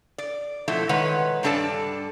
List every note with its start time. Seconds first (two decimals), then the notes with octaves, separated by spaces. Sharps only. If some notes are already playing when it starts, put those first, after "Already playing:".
0.18 D5
0.68 B2 F3 A3 E4
0.89 D#3 G#3 B4 C#5 F#5
1.43 G2 G3 D4 A4 D5 A5